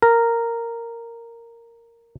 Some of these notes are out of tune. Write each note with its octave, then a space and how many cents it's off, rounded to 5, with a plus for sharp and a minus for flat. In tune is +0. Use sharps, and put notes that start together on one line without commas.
A#4 -10